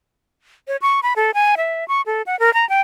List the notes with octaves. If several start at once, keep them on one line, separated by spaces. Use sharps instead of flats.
C#5
C#6
B5
A4
G#5
E5
C#6
A4
F#5
A#4
A#5
G5